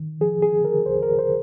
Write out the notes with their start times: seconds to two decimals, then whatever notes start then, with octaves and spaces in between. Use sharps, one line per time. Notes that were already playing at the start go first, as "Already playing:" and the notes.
Already playing: D#3
0.21 F3 G#4
0.42 G#4
0.53 D3
0.65 A#4
0.86 D#2 C5
1.03 A#4
1.19 C5